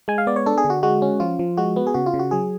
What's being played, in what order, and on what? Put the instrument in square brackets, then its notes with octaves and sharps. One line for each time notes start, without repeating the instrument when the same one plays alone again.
[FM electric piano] G#3 G#5
F5
B3 D5
C#5
D4 A4
G#4
D3
F#4
G#3 F#4
C#4
F3 F4
F3
G#3 F#4
B3
G#4
C#3 F#4
F4
C#3
F#4
F#3 G#4